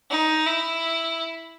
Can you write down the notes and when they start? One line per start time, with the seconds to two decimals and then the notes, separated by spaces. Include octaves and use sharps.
0.11 D#4
0.46 E4